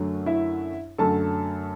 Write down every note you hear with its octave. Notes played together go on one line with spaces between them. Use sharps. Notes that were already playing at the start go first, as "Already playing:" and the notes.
Already playing: F#2 D3 F#3 A3
E4 E5
F#2 D3 F#3 A3 A4 A5